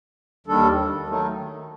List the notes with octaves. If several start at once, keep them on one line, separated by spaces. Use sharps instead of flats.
D#2 D#3 G3 D4 A4
D#3 F#3 A3 D#4